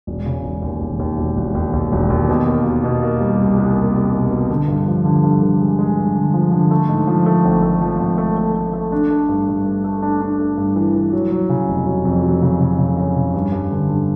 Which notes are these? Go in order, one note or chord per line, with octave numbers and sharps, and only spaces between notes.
E1
C#3
E1
D#2
E1
D#2
E1
E1
D#2
D#2
E1
D#2
B2
A#3
B2
B2
A#3
G3
C2
C2
A#3
C2
B2
B2
D3
G2
F3
D3
G2
D3
G#3
G#3
G2
D3
F3
D3
A3
G#2
F3
A3
G#1
A3
F3
G#1
A3
A3
A3
A3
D4
A3
G2
G2
A3
A3
D4
D4
A3
G2
E3
E3
F#3
F#3
C#3
F1
F#3
F2
F#3
C#3
C#3
C#3
C#3
C#3
G2
G2
D3
G2